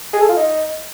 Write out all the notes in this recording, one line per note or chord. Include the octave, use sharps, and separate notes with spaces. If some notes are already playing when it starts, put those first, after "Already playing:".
G#4
A4
F4
D#4